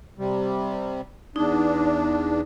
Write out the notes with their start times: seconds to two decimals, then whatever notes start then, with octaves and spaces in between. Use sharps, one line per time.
0.18 C3 G3
1.36 E2 D4 D#4